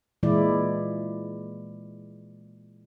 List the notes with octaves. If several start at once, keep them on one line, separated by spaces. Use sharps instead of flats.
A#2 E3 G#3 E4 D5